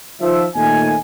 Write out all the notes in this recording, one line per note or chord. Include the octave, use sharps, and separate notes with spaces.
D#3 F3 E5
D#2 A#2 A3 D#4 G#5